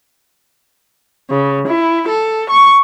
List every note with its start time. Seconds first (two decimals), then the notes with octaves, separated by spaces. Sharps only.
1.30 C#3
1.67 E4
2.08 A4
2.50 C#6